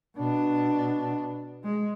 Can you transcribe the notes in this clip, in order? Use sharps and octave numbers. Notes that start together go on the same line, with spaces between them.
B2 D4
G#3